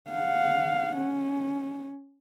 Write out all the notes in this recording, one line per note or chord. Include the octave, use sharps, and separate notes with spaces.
F5 F#5
C#4